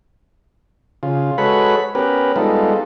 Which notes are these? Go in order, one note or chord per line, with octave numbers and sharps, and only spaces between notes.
C#3 F4
G#3 F#4 A4 B4 C#5 B5
B3 C#4 G4 A#4 B4
G3 G#3 B3 D#4 F4 A4